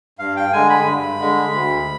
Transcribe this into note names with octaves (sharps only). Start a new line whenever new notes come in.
G2 F5
G5
D3 G#3 G#5
B5
G2
D3 G#3
D2